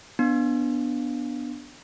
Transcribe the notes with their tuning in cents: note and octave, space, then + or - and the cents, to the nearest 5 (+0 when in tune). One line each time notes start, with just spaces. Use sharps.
B3 +0 D4 +0